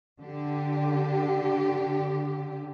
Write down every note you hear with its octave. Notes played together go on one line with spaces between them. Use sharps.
D3 G4